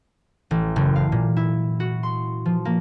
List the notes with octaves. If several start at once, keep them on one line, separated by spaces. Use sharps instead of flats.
A1
F#1
F5
A#2
E4
F#4
C6
F3
A#3